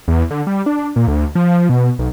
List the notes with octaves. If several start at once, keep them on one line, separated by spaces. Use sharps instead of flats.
E2
D3
G3
D4
A#2
D2
F3
B2
B1